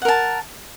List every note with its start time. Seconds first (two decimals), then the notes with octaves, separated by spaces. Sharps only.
0.02 F#5
0.05 A#4
0.08 A5